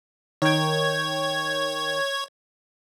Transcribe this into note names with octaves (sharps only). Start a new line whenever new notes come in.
D#3 C#5 G5 G#6